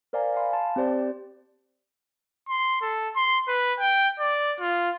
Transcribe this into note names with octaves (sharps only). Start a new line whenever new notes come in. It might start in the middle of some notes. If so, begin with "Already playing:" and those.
A#4 C5 D5 F5 G#5 A#5
F5 G#5 B5 C6
A5 C6
C4 G4 C5 D5
C6
A4
C6
B4
G5
D5
F4